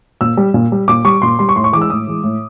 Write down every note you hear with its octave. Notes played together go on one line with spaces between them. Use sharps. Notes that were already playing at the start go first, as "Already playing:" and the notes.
A#2 E6
G3
A#2
G3
A#2 D6
G3 C#6
A#2 C6
G3 C6
C#6
A2 C6
C#6
E3 G#3 D6
E6
A2 D#6
E3 G#3
A2